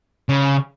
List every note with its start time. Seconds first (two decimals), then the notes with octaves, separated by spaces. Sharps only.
0.29 C#3